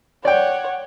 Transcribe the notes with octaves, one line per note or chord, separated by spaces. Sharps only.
C#5 D5 F#5 G5